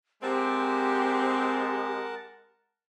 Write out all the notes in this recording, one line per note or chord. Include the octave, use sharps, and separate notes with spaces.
G#3 C4 G4 A#4 F#5 A5